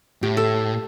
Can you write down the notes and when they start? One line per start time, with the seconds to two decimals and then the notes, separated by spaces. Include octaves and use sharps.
0.22 A2 G4
0.37 A4